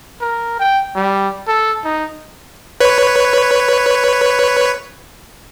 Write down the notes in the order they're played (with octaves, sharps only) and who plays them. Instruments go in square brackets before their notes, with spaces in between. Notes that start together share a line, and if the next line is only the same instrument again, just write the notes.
[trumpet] A#4
G5
G3
A4
D#4
[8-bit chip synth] B4 C#5